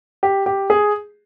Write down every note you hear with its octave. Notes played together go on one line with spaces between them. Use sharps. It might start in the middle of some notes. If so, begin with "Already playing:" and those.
G4
G4
G#4